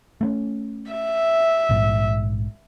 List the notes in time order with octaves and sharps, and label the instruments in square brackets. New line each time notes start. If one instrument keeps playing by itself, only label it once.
[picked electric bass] A3 C4 C#4
[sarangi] E5
[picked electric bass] A#1 G#2